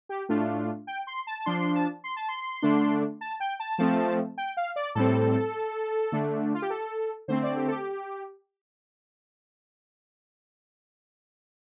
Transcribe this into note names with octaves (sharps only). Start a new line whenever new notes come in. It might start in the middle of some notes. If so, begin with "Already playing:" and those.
G4
A2 A3 D4 F4
G5
C6
A5
A5
F3 D4 C6
C6
A5
C6
A5
C6
D3 A3 D4
A5
G5
A5
F3 A3 C4
G5
F5
D5
A2 G3 C4 A4
D3 A3 D4
F4
G4
A4
D3 A3 C4 C5
D5
G4
A4
G4